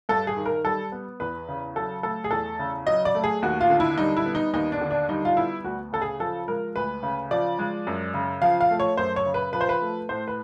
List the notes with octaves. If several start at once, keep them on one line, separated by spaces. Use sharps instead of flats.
G2 A4
G#4
D#3
A#4
G3 A4
B3
E2 B4
C#3
F#3 A4
A3 A4
G#4
E2 A4
C#3
F#3 D#5
D5
A3
G#4
D#2 F#4
F4
D3
E4
G3 D#4
E4
B3
D#4
D#2 D#4
D4
D3
D4
G3 D#4
F4
B3 E4
D2 F#4
C#3 A4
G#4
F3 A4
G#3 A#4
D2 B4
C#3
F3 D5
G#3
F#2
C#3
F3 F5
F5
A3
C#5
F#2 C5
C#5
C#3
B4
F3 B4
C5
B4
A3
A2 C5
B4